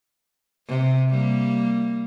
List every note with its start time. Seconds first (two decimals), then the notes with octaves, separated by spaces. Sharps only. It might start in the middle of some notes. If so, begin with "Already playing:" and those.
0.67 C3
1.10 G3 A#3